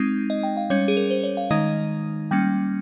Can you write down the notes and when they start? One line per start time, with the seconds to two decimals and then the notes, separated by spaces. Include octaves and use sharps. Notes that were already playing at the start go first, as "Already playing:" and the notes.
Already playing: G#3 C4 D#4
0.30 D#5
0.43 G5
0.57 F5
0.70 G3 C#4 C#5
0.88 G#4
0.97 A#4
1.10 C5
1.24 C#5
1.37 F5
1.50 D#3 G#3 D#4 D#5
2.31 G3 A#3 C#4 G5